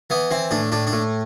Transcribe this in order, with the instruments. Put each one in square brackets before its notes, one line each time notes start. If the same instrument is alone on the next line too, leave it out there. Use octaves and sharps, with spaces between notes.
[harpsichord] E3 B3
E3 C4
A2 D4
A2 D4
D4
A2